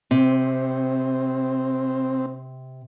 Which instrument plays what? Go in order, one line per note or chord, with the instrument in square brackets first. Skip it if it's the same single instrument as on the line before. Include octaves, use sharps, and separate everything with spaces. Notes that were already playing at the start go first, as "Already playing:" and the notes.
[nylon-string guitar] C3 [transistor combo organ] C4